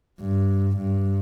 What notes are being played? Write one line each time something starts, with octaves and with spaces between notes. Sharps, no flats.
G2
G2